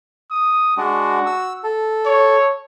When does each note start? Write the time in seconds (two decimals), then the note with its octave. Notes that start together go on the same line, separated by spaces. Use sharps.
0.31 D#6
0.77 G#3 D4 F#4
1.26 E6
1.63 A4
2.06 C#5